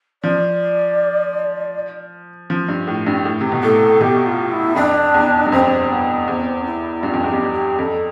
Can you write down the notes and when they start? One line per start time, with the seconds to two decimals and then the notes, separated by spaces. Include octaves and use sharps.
0.23 F3 D5
2.50 F3
2.68 G2
2.87 A2
3.07 G2
3.25 A2
3.41 C3
3.52 B2
3.63 A2 A4
4.01 B2 G4
4.26 F4
4.51 E4
4.76 F2 D4
5.14 E2
5.46 G2
5.52 F2 C4
5.90 B3
6.28 E2 C4
6.65 E4
7.03 G2 F4
7.13 F2
7.24 E2 G4
7.33 F2
7.53 G4
7.78 F2 A4